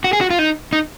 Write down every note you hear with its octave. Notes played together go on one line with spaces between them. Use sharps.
F#4
G#4
F#4
F4
D#4
D#4